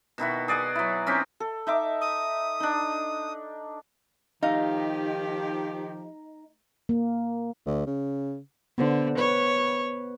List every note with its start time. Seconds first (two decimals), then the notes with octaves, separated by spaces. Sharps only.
0.18 B2 D#3 E4 F#4
0.48 G#4 D5 D#5 F#5
0.75 F#3 E4
1.07 C4 C#4 D#4 G4
1.40 A4
1.67 D#4 E5 D6
2.01 D#6
2.60 D4 D#4
4.43 D#3 F3 A3 D#4 G4 D#5 F5
6.89 A#3
7.66 D2
7.87 C#3
8.78 D3 B3 C5
9.18 B4 C#5